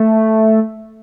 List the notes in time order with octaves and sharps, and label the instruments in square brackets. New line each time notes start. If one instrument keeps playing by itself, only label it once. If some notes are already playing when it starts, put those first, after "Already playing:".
Already playing: [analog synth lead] A3